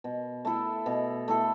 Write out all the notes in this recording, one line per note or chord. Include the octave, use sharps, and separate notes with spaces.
B2
A3 E4 A4
B2
A3 E4 A4